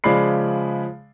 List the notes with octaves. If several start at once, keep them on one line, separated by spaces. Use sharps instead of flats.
C#3 F3 G#3 D5 B5 C7